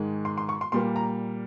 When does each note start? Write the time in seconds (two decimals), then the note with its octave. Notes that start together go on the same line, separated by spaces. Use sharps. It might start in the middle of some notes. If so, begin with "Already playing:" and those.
Already playing: G#2 D#3 G#3
0.25 C6
0.38 C6
0.49 C#6
0.61 C6
0.72 A#2 G3 A#3 C6
0.96 A#5